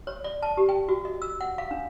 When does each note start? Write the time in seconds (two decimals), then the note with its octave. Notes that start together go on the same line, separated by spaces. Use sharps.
0.07 C#5
0.24 D5
0.43 A5
0.57 G4
0.69 G5
0.89 F#4
1.05 D#5
1.22 E6
1.41 F#5
1.58 F5
1.71 D4